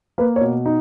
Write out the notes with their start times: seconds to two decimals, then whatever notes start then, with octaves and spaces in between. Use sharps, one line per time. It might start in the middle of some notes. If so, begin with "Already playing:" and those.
0.18 A#3 B4
0.36 C#5
0.41 B2
0.66 D#4